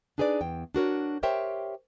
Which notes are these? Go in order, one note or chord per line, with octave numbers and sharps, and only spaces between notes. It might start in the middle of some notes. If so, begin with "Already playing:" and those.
D4 D#4 G#4 B4 C5 D5
E2 G5
D4 F#4 A#4 C#5
G4 A#4 C5 C#5 E5 G5